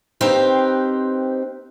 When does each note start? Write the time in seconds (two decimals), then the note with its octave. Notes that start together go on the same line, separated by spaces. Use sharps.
0.21 C4 D#4 G4 B4 C5 F5